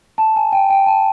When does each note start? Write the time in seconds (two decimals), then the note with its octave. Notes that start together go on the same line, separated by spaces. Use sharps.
0.18 A5
0.36 G#5
0.52 G5
0.70 G5
0.87 A5